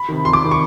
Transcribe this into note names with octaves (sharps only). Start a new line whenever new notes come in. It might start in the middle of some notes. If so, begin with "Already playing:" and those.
Already playing: B5
C3 D#3
F2 C6
D6
C3 D#3
C#6